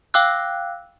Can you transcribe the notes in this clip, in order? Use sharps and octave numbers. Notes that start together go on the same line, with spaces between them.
F5 G5 D6 E6 F#6